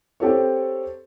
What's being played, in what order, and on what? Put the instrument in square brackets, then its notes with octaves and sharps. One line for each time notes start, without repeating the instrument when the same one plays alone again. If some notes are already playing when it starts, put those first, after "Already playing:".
[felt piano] C4 G4 A4 C#5